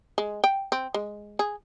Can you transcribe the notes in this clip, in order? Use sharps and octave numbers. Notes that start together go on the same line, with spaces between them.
G#3
G5
C4
G#3
G#4